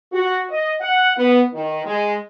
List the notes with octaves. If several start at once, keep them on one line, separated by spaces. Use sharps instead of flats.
F#4
D#5
F#5
B3
D#3
G#3